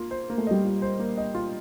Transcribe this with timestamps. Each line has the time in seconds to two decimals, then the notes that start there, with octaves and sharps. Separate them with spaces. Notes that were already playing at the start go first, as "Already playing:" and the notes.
Already playing: A#3 F4
0.11 C5
0.30 A#3
0.38 A3
0.47 G3 D#5
0.65 F4
0.82 C5
0.99 A#3
1.17 D#5
1.35 F4